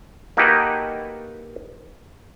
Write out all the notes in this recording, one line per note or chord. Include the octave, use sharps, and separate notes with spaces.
A#3 D#4 F#4 G4 A4 B4